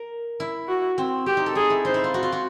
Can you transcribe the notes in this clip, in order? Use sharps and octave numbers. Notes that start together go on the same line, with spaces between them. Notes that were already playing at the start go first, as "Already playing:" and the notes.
Already playing: A#4
E4
F#4
C4
C4 G4
D#4
A4
D#4 G#4
E4
D#4 C5
E4
F4
F#4
F4
F#4